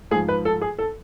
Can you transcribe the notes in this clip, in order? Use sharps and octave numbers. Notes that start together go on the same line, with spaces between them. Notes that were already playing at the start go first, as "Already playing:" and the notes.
G#2 F3 G#4
B4
A4
G#4
A4